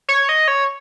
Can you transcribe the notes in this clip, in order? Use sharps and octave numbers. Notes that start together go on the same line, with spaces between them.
C#5
D#5
C#5